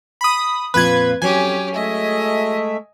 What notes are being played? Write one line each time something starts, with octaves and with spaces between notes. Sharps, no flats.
B5 D#6
F2 A#2 F4 B4 G#6
F2 F#3 C#4 G4 G#5
G#3 A3 D#5 E5